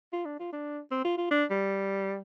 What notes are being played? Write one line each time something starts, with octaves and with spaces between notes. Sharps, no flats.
F4
D4
F4
D4
C4
F4
F4
D4
G3